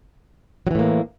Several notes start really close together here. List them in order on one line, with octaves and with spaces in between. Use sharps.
F#3 E3 A2 A#3